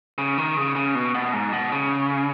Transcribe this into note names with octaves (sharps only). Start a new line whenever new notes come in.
C#3
D#3
C#3
C#3
B2
B2
G#2
B2
C#3